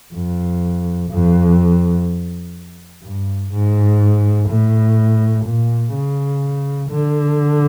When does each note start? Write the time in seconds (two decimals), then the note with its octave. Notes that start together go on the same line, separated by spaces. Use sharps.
0.14 F2
1.10 F2
3.02 G2
3.52 G#2
4.49 A2
5.45 A#2
5.93 C#3
6.90 D3